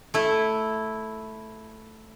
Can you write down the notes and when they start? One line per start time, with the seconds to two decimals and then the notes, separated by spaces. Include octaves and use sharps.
0.14 A3 E4